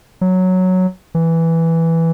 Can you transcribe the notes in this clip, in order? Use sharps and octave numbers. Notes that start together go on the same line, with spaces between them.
F#3
E3